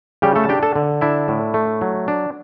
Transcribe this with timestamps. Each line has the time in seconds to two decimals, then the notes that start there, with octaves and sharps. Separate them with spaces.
0.22 C#3 G3 G4
0.35 A3 A4
0.44 A5
0.49 D4 G4 G5
0.63 A4 A5
0.76 D3
1.01 D4 E4 E5
1.28 A2
1.54 A3
1.81 F#3
2.08 D4